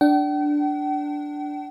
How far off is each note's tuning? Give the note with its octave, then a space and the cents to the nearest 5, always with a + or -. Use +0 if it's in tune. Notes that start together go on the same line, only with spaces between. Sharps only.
D4 +0 G5 -45